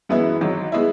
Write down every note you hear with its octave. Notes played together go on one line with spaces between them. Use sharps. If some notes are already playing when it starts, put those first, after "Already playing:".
F#2 E3 G#3 B3 E4
G#1 G#2 F#3
G#3 B3 E4